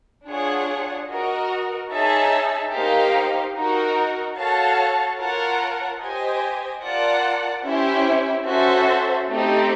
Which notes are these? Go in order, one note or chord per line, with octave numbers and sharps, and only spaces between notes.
D4 F4 G#4 C#5 F#5
F#4 A#4 D#5
D#4 G#4 C#5 E5 A5
A#3 D#4 G4 C5 F5
D#4 F#4 A#4
F#4 A4 C#5 F5 A5
F4 A#4 C#5 F#5 A5
G4 C5 D#5 G#5
F4 A#4 D5 F#5 A5
C#4 E4 G4 C5 E5
C#4 F#4 A4 C5 E5
A3 C4 D#4 G4